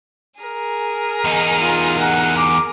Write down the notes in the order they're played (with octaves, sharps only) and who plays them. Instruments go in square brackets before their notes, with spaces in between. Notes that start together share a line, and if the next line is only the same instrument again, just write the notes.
[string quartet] G#4 A#4
[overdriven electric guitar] E2 D#4
[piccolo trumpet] F4
F#5
D6